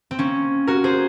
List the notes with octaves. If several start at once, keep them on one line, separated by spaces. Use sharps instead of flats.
C4
A#3 C#4
F#4 A#4
G#4 C5